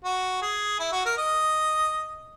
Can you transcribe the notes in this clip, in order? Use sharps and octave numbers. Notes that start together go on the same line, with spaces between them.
F#4
G#4
E4
F#4
A#4
D#5